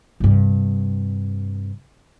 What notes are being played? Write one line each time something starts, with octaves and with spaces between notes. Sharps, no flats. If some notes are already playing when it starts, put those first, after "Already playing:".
G2 C3